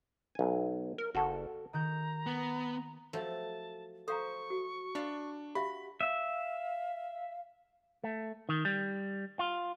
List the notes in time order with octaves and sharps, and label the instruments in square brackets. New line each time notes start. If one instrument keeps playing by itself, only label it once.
[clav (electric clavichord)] B1 G#5
[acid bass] A#4
[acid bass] F#1 [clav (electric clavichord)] F#4 A4
[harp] D#3 F#4 G6 [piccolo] A#5
[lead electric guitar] B3
[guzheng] F3 F#3 A3 [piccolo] A5
[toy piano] A4 F5 A#5 [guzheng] C5 [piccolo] C#6
[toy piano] F#4
[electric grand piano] D4 [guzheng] F5 A5 B5
[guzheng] F#4 [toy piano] G4 E5 F5 [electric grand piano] B5
[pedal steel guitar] E5 [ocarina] F5
[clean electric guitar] A3
D#3
G3
F4